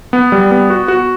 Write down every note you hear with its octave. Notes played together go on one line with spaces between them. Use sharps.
B3
G3
B3
F#4
F#4